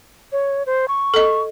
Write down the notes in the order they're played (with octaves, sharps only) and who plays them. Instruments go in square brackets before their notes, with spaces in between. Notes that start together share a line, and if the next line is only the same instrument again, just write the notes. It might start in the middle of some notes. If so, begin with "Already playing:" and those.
[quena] C#5
C5
C#6
[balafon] A4 D#5